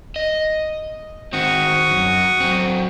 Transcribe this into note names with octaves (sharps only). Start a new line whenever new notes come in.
D#5
D#3 C4 F#4 C#6 D#6
F#2
F#3 C4